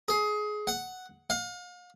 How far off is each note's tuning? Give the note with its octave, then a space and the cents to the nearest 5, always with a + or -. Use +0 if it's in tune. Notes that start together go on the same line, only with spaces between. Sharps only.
G#4 +20
F#5 +0
F5 +40